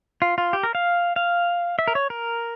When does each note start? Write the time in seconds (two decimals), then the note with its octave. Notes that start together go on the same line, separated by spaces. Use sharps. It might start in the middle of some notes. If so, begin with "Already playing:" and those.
0.22 F4
0.38 F4
0.53 G4
0.63 A#4
0.75 F5
1.16 F5
1.79 E5
1.88 A#4
1.95 C#5
2.10 A#4